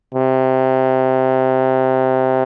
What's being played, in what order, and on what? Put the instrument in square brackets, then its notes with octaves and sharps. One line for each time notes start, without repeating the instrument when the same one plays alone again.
[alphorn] C3